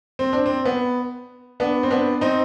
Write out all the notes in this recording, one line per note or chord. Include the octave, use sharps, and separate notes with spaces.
C4
D4
C4
B3
B3 D4
C4
B3 D4
C4 D#4